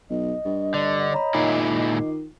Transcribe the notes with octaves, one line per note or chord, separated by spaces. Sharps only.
B1 D#5
G2 G4
D3 D5
C#5 A#5 B5
A#2 D#3 G#3 E4 F4 D6 C7